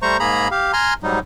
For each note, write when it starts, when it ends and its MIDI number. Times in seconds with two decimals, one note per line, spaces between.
0.02 0.17 55
0.02 0.17 57
0.02 0.17 72
0.02 0.17 82
0.02 0.17 85
0.19 0.48 44
0.19 0.48 58
0.19 0.48 68
0.19 0.48 82
0.19 0.48 83
0.51 0.72 67
0.51 0.72 77
0.73 0.94 80
0.73 0.94 82
0.73 0.94 84
0.73 0.94 89
1.03 1.19 44
1.03 1.19 54
1.03 1.19 55
1.03 1.19 63